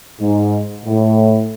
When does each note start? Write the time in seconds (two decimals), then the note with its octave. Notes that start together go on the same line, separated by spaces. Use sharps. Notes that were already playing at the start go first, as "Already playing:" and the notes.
0.21 G#2
0.86 A2